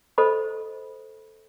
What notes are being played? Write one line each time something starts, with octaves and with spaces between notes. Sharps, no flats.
A4 C5 D#5 B5